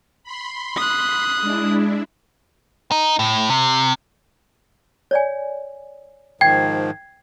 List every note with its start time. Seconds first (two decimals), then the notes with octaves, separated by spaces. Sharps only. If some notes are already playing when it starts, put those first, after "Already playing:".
0.24 B5 C6
0.76 D#6 F#6
1.42 G#3 D4 E4
2.91 D#4
3.19 A2
3.50 C3
5.11 C#5 D5 G#5
6.41 G#2 D#3 F3 G5 G#6 C7